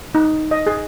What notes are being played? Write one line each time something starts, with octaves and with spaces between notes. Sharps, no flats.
D#4
D#5
G#4